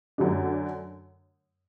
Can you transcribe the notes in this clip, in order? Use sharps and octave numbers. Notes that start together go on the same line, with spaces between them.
F#2 D3 A3 D4